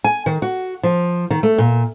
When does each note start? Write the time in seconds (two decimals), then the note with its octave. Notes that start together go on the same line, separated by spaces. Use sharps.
0.04 G#5
0.26 D#3
0.42 F#4
0.83 F3
1.30 D#3
1.43 A3
1.58 A#2